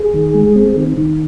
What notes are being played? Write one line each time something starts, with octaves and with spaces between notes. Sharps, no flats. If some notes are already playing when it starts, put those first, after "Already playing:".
Already playing: G#4
D#3
G#3
C4
D#3
D#3